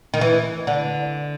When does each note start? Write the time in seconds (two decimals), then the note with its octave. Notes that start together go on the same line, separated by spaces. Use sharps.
0.14 D#3
0.21 E3
0.67 D3